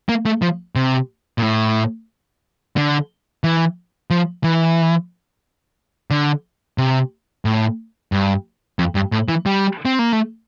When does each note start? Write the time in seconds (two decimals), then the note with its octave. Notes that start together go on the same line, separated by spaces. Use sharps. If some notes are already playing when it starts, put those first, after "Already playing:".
0.09 A#3
0.26 A3
0.42 F3
0.76 C3
1.38 A#2
1.42 A2
2.77 D3
3.44 E3
4.10 F3
4.44 E3
6.11 D3
6.78 C3
7.45 A2
8.12 G2
8.79 F2
8.95 G2
9.12 A2
9.28 E3
9.46 G3
9.85 C4
9.99 A#3
10.13 A3